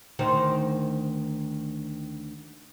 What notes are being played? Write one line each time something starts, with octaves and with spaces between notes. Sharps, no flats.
D2 D#3 C5